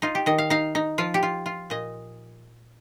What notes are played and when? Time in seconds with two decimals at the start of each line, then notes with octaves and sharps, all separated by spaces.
0.02 D#4 F4
0.15 G4
0.26 D#3 D#5
0.38 F5
0.50 D#4 F5
0.75 D#4
0.98 F3 F4
1.14 G4
1.23 F4
1.46 F4
1.70 A#2 D#5